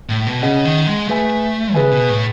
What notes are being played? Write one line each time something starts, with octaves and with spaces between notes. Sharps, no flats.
A2
B2
C#3 C#4 G#4 D#5 F#5
D#3
G#3
A3 G#4 B4 E5 G#5
C#3 G#4 B4 E5 G#5
B2
A2